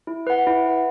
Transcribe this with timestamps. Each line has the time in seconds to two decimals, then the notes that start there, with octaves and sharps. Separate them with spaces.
0.07 E4
0.27 B4 F#5
0.47 E4
0.66 B4 F#5